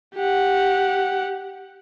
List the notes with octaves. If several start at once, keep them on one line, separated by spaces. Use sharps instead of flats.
G4 F#5